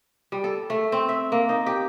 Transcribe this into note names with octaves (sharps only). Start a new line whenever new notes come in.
G3
A4
A3
C4
E5
A#3
D#4
G4